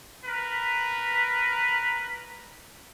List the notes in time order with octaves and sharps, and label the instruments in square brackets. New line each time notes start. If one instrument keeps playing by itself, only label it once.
[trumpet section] A#4 B4